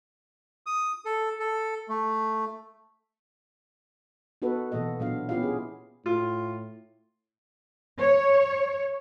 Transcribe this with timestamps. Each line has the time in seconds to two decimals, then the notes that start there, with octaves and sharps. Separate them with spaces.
0.66 D#6
1.05 A4
1.40 A4
1.89 A3
4.42 B3 D#4 F#4 A4 B4
4.72 B2 E3 A#3 A4 D#5
4.99 A#2 F#3 B3 D4 F5
5.29 B3 C#4 E4 F4 G4 F5
5.43 G#4
6.06 A2 F4
8.00 C#5